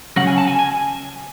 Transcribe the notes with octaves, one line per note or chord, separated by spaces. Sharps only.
C#3 F#3 C#4 F#5
G#5
A5
G#5
G#5